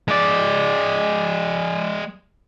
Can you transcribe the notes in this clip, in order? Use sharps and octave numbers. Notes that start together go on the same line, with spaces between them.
G#3 D5